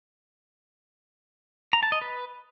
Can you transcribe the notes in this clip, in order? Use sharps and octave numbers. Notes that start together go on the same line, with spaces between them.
A#5
A5
D#5
B4